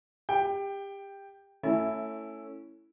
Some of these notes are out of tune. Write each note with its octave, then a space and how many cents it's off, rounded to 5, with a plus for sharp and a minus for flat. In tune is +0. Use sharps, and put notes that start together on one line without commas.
G4 +25 G5 +5
A3 +20 C#4 +0 E4 +0